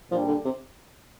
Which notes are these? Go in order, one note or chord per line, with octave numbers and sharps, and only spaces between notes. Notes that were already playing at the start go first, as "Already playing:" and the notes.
A#2 F3 G3 D4 G4
D3
C3